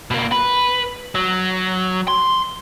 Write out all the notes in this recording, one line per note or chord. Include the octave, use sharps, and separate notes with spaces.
B2 A#3
B4
F#3
C6